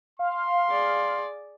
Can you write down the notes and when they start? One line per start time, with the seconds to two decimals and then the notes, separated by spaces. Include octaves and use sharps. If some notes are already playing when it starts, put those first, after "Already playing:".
0.19 F5 C6
0.70 G#4 D5